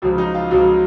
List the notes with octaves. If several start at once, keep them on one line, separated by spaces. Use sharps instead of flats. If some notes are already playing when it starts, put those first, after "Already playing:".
C#2 C#3 F3 F#3 F#4
D#4
F4
C#2 C#3 F3 F#3 F#4